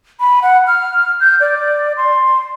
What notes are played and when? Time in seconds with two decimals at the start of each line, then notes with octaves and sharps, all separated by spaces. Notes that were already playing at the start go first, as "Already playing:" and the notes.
0.20 B5
0.42 F#5
0.67 F6
1.20 G6
1.40 D5
1.97 C6